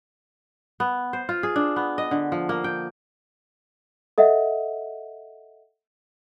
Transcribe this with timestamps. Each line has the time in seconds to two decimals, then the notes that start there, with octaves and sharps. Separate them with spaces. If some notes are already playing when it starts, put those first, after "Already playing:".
0.80 B3
1.13 C5
1.29 F4
1.43 G#4
1.56 D4
1.76 B3
1.98 D#5
2.11 D3
2.32 F3
2.49 A#3
2.64 G5
4.18 A4 D#5 E5 F#5